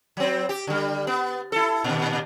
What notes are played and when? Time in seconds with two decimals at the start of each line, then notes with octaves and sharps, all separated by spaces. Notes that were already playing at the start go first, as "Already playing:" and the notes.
0.17 F#3 C4
0.49 G4
0.67 D3 G3
1.07 B3
1.52 E4 A4
1.84 A#2 D#3